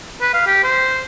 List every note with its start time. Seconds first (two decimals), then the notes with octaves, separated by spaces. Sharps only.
0.21 B4
0.34 F5
0.47 G4
0.64 C5